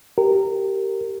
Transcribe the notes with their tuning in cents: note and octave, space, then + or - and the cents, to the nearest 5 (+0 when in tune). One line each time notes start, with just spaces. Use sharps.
G4 -10 A#4 -15